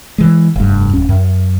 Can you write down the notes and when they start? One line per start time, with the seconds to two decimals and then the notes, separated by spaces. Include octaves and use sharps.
0.18 E3 G#3
0.56 F1 G2
0.93 D1 C#4
1.09 F#2